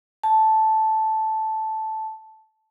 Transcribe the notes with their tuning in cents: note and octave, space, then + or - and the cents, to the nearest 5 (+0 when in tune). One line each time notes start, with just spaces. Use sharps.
A5 -5